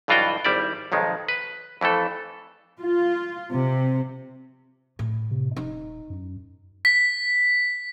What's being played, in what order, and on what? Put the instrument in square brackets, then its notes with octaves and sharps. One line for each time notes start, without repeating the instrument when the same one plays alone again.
[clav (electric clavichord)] B1 G2 E3 F4 F#4 G5
G#1 G3 E4 D5
B1 F2 D#3 G#3
B4
F2 E3 A3 A4
[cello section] F4
C3
[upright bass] A2
[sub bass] C3
[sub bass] D#1 [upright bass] D#4
[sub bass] F#2
[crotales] B6